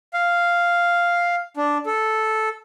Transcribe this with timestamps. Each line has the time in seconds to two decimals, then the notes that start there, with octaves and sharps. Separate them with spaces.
0.14 F5
1.57 D4
1.86 A4